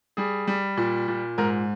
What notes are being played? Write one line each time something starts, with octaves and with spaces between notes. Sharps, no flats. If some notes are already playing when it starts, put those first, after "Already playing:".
G3 G#4
G3
A#2
A#2
G#2 A#4